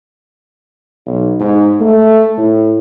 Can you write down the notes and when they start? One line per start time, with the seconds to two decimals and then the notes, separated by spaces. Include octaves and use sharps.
1.06 B1
1.40 G#2
1.80 A3
2.37 A2